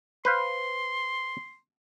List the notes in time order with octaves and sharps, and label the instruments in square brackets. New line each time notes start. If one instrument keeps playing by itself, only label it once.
[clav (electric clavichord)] B4 C5 F5 [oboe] C6